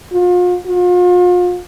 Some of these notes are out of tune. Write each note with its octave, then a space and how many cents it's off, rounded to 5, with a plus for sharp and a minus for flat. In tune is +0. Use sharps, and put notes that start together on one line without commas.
F4 +40
F4 +40